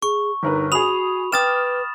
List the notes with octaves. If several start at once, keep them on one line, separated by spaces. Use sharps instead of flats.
G#4 C#6
G1 D#4 A#4 B4
F#4 G#4 B5 D#6 F7
B4 G5 D6 D#6 F6 A6 E7